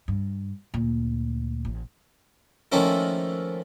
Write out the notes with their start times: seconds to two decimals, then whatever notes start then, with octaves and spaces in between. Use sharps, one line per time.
0.08 G2
0.74 D2 A#2
1.65 A1
2.72 D#3 F3 A3 A#3 C#4 E4